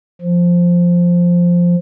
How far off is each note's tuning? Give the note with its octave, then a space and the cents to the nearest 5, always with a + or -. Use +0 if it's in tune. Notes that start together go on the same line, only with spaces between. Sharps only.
F3 +0